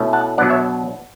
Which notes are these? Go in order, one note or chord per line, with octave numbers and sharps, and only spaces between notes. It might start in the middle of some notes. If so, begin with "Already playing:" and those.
Already playing: B2 A3 C#4 E4
F#5 A5
B2 F#3 B3 D4 D5 F#5
C#5 E5